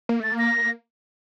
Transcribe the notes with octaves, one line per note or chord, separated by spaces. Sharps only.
A#3
A3 A6
A#3
A#6